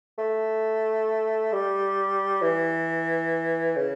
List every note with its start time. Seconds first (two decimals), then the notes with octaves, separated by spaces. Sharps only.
0.18 A3
1.52 G3
2.42 E3
3.76 C#3